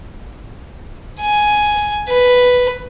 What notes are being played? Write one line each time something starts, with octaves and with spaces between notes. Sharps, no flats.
G#5
B4